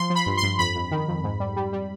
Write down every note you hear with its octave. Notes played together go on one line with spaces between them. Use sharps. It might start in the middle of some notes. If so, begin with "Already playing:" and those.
Already playing: F3 C6
F3
B5
G2
C6
G2
F2 B5
F2
D#3
F2
G#2
G3
G3
G3